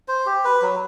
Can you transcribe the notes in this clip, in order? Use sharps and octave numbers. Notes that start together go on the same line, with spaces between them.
C5
G4
B4
F#3